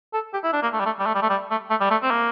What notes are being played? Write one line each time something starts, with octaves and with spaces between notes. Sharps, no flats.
A4
G4
E4
D4
A#3
A3
G3
A3
G3
A3
G3
A3
G3
A3
A3
G3
A3
C4
A#3